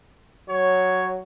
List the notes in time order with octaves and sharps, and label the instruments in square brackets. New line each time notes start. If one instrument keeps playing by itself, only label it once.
[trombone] F#3 [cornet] C#5